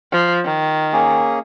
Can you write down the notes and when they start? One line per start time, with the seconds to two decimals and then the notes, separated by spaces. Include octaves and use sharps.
0.12 F3
0.44 D#3
0.93 A#3 C#4 G#4